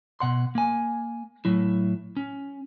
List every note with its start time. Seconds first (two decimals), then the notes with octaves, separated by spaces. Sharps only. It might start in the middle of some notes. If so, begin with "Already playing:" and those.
0.20 B2 F#5 C6
0.55 A#3 G#5
1.45 A2 F#3 E4
2.17 C#4